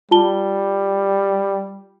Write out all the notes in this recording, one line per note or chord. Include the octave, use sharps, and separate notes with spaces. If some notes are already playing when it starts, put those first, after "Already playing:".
G3 F4 A5 G7